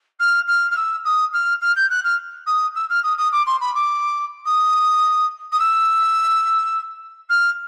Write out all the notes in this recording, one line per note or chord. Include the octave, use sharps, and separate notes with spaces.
F6
F6
F6
E6
D#6
F6
F6
G6
F#6
F6
D#6
E6
F6
D#6
D#6
D6
C6
B5
D6
D#6
D#6
E6
F6